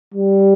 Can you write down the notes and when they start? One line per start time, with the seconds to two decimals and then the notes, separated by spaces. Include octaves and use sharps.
0.14 G3